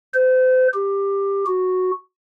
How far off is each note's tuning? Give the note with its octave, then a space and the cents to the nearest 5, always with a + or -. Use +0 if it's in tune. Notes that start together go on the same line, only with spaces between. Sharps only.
C5 -35
G4 +15
F#4 -5